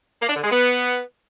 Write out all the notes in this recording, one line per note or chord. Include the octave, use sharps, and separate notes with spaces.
A#3
D4
D3
G#3
B3